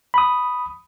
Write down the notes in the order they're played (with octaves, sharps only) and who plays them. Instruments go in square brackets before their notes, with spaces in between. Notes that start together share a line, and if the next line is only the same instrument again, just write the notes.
[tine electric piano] B5 D#6